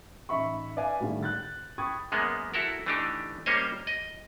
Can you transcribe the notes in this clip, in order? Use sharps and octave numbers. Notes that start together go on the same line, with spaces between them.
A1 D#4 E5 B5 C#6
B4 D5 E5 F5 G#5
A2 D3 D#3 G3 G#3
F#6 G6 A6
G5 B5 C#6 D#6 G#6 A6
F#2 G#3 A#3 B3
E4 F#4 A4 A#4
E3 A3 D4 D#4 G4
G3 A#3 C#4 C5 C#5 D#5
D#5